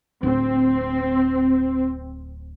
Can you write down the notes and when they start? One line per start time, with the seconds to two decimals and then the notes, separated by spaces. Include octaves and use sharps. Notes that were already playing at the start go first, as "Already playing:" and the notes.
0.23 D1 C4